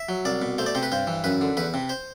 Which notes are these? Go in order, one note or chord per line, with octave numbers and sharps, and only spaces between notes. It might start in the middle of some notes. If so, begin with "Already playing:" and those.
Already playing: E5
F#3
C2 D5
B2
A3 C5
D5
C3 C5
B4
G2 C5
E3
F#2 B4
D3
E2 B4
C3
C5